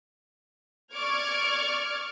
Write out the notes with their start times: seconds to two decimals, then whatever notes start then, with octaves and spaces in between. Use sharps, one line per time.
0.93 D5 C#6 D6 F6 G#6